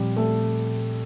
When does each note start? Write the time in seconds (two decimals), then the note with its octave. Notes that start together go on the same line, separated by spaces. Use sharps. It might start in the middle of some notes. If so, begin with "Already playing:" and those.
Already playing: A#2 F3 G3 C4
0.16 A3